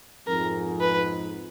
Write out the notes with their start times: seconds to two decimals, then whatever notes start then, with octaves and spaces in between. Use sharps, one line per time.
0.27 F2 G#2 A#4
0.81 B4